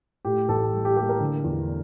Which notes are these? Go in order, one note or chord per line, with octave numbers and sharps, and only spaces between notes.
A2 G4
A1 A4
G3
G4
A#3 G4
A#4
D3
E2